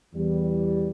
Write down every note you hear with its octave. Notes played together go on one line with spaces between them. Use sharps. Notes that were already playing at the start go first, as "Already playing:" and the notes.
E2 E3 G3